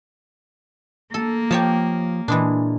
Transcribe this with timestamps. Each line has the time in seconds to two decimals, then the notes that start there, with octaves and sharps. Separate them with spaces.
1.14 A#3 A4
1.51 F3 G4 C#5 A5
2.28 A#2 E3 G#3 D4